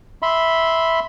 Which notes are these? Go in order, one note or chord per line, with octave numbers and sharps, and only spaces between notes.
E5 B5 C6